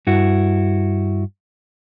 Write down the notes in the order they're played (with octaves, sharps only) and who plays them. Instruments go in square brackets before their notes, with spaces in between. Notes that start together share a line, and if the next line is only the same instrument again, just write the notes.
[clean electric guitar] G2 E4 F#4